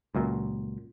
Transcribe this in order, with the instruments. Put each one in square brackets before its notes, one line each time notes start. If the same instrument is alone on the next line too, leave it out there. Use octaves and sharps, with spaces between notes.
[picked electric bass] C#2 F#2 A#2